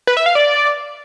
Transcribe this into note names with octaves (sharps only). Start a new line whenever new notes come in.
B4
E5
F5
D5